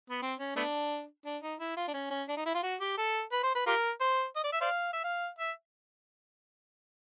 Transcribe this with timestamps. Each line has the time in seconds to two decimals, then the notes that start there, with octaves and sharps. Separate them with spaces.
0.10 B3
0.22 C4
0.39 C#4
0.56 A3 B3 D4
1.25 D4
1.43 D#4
1.60 E4
1.77 F4
1.88 D4
1.94 C#4
2.11 C#4
2.29 D4
2.37 D#4
2.46 E4
2.54 F4
2.63 F#4
2.81 G4
2.98 A4
3.32 B4
3.44 C5
3.55 B4
3.67 F4 G4 A#4
4.01 C5
4.36 D#5
4.44 D5
4.53 E5
4.61 C5 D5 F5
4.93 E5
5.04 F5
5.39 E5